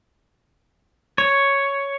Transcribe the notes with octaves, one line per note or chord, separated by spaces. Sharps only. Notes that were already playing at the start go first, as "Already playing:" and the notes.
C#5